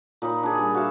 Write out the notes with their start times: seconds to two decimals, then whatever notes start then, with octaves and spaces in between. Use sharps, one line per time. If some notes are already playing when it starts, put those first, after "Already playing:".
0.22 A#2 D#4 D#5 B5
0.43 D4 G#4
0.58 G3 G#4
0.75 F#4 E5 F5